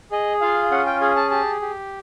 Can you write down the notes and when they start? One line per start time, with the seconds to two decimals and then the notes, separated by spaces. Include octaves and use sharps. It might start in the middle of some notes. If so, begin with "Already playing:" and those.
0.11 G#4 D#5
0.41 F4 F5
0.71 C#4 F#5
0.86 G5
1.01 G#4 G#5
1.16 A5
1.31 G4 A5
1.61 G4